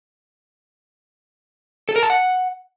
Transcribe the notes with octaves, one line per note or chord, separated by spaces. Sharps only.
A4
A#4
A5
F#5